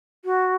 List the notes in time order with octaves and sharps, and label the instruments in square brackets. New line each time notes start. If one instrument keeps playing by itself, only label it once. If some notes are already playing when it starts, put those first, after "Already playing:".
[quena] F#4